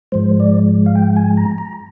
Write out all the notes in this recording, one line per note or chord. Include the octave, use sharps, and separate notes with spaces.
G#2 F3 G#3 C5
D5
F5
G5
G#5
A#5
A#5